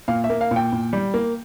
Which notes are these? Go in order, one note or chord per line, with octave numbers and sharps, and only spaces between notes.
A#2 F5
E5
A#3
F5
A#2
G5
A#2
G3
A#3